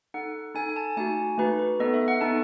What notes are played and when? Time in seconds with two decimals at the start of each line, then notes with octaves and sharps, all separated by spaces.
0.14 D#4 A4 F#5
0.55 D#4 A4 G#5
0.69 G#5
0.76 A5
0.97 A3 D#4 F#4 G#5
1.38 A3 D#4 F#4 B4
1.59 B4
1.80 B3 D#4 A4 D#5
1.94 E5
2.08 F#5
2.21 B3 D#4 A4 A5